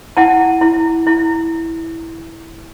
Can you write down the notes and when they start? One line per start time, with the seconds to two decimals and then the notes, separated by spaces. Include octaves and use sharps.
0.17 E4 F#5 A5
0.61 E4
1.07 E4